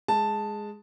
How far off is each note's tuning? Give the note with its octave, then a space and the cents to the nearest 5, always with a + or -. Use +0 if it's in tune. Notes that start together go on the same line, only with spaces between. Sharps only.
G#3 +0 A5 +0